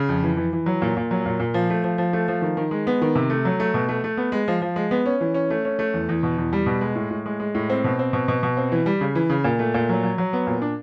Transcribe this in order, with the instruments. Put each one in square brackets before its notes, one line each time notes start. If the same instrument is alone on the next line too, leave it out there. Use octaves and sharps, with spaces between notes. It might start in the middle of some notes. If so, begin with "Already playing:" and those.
Already playing: [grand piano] C#3
F2
E3
E3
E3
F#3
A#2
A#2
F#3
A#2
A#2
F3
A3
F3
F3
A3
F3
D#3
D#3
G#3
B3
D#3
C3
A3
F#3
A3
B2
A3
A3
B3
G#3
F3
F3
G#3
B3
C#4
E3
C#4
A3
C#4
A3
E2
E2
B2
E2
G3
B2
G#3
A2
A2
G#3
G#3
A2
C4
B2
C4
B2
B2
B2
C4
E3
G3
C#3
E3
C#3
A#2
A3
A#2
F#3
F#3
F#3
B3
A#2
D4